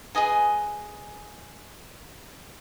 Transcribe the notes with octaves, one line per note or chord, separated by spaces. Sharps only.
G#4 B4 D#5 G#5